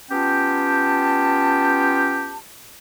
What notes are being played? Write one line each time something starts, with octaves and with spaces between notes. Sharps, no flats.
B3 C#4 F4 G4 G5 A5